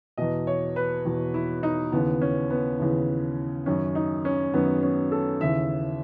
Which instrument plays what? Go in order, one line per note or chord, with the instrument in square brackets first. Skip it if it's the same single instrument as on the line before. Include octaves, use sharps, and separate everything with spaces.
[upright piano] E2 B2 D#5
C#5
B4
E2 B2
E4
D#4
D#2 C#3 E3 B3
C#4
B3
D#2 C#3 E3
F#2 D#3 C#4
D#4
C#4
F#2 D#3 B3
C#4
A4
D#2 C#3 E3 E5